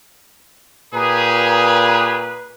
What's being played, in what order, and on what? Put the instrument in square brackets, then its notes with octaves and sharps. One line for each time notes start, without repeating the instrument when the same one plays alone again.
[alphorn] A#2 [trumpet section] G4 G#4 [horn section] B4 [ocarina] A#5